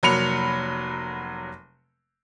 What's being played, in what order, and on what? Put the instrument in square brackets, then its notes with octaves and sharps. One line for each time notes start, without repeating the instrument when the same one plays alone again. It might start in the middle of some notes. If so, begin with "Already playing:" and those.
[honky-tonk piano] F1 F#3 A#3 B5 C#7 F7